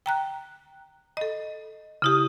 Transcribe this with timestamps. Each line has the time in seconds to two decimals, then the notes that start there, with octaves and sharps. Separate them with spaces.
0.06 G5 A#5 F#6
1.17 A4 D#5
2.02 C#3 E4 G4 D#6